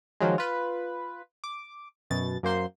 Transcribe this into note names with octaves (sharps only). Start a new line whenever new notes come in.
D#3 F3 F#3 G#3
F4 B4
D6
F#2 B2 A6
F#2 A#3 C5 C6